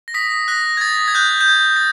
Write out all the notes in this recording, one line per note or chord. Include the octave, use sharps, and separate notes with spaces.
A#6
D#6 B6
F#6 A#6
G#6
D#6 A6
G#6
F#6 G6
G6
D#6 G#6
A6